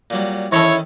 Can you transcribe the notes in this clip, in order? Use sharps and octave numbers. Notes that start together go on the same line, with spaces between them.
A#2 F#3 G3
D#3 E3 C#4 E4 A4 C#5 E5 A5